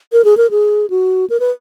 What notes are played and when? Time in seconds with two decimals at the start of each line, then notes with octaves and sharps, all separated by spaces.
0.13 A#4
0.24 G#4
0.37 A#4
0.51 G#4
0.90 F#4
1.30 A#4
1.40 B4